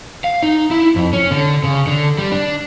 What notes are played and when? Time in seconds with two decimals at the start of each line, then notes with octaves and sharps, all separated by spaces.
0.24 F5
0.43 D#4
0.71 E4
0.96 F2
1.13 C#4
1.31 D3
1.64 C#3
1.87 D3
2.18 G3
2.32 D4